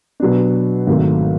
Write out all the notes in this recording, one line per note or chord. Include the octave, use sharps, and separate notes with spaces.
B2 F#3 B3 D4
G#1 G#2 D#3 F#3 A3